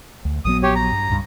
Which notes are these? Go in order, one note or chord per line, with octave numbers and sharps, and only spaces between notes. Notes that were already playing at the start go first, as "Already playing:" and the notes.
D2
A#1 F#3 B3 D#6
G4 C#5
A#5
G2
C#2 G2